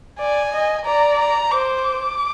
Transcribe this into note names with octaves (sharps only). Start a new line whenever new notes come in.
D5 G#5
D#5
D5 A#5
A#5
C5 D6
D6